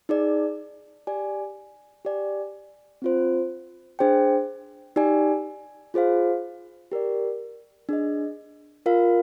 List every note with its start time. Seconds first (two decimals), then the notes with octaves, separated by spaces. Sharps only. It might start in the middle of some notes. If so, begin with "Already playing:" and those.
0.09 D#4 G#4 D5
1.07 G4 D5 G#5
2.05 G4 D5 G#5
3.02 C4 F4 C5
3.99 D4 G#4 C5 G5
4.96 D#4 G4 D5 G#5
5.94 F4 G#4 C5 F5
6.91 G4 A#4 D5
7.89 D4 G#4 D#5
8.86 F4 A#4 F5